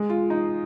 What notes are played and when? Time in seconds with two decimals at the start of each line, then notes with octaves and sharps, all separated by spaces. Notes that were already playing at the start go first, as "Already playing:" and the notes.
Already playing: G#3
0.09 F4
0.30 D#4